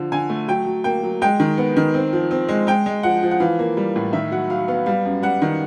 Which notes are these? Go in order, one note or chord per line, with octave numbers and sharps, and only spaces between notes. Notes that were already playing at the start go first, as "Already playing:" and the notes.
Already playing: D3 F3
D3 G#5
A3
F#3 G5
F#3
A#3 G5
F#3
G#3 G5
D#3
B3
D#3
C4
F3
C4
G#3
G#3 G5
G#3
F3 F#5
F3
F#5
E3 F5
A#3
G3
A2
D#3 E5
F#3 F#5
F#3 F5
B3 F5
G3 F5
F#2
G3 F#5
D#3